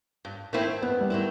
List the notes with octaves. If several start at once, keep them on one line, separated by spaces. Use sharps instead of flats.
G2
D#3 A3 C4 E4
G2 B3
G3
D#3 A3 C4 E4